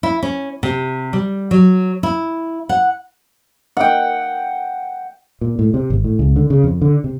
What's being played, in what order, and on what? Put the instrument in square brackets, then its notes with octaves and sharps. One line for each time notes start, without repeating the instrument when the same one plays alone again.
[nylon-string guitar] E4
C#4
C3
G3
F#3
E4
F#5
[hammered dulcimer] F#5 G5
[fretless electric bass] A#2
A2
C3
G#1
A2
C#2
D3
C#3
F2
D3
C3